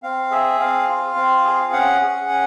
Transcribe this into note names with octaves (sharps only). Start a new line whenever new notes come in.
C4 F5
G#4 E5
C4 F5
F4
C4
G#4
C#4 F#5
G#4
C#4